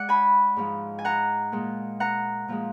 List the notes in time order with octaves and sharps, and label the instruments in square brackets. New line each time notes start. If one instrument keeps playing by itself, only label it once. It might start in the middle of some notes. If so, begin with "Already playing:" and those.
Already playing: [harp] G#3 D5 F#5
G#5 B5
G#2 F3 G#3
G#5
F#5 A#5
A#2 G#3
F#5 A#5
A#2 F3 G#3